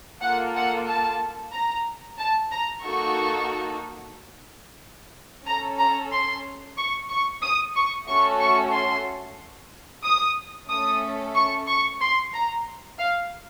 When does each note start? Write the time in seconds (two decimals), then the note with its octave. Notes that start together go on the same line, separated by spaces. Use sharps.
0.22 A#3 F4 A4 F#5
0.55 F#5
0.87 A5
1.52 A#5
2.18 A5
2.51 A#5
2.84 A#3 D#4 F#4 A4 C#6
5.46 C#4 A4 A#5
5.79 A#5
6.11 C6
6.77 C#6
7.09 C#6
7.42 D#6
7.75 C#6
8.07 A3 C#4 F#4 A4 C#6
8.40 C#6
8.73 C6
10.04 D#6
10.70 A3 C#4 A4 D#6
11.35 C#6
11.67 C#6
12.01 C6
12.34 A#5
12.99 F5